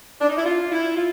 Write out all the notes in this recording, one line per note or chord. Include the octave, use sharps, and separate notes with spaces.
D4
D#4
E4
F4
E4
F4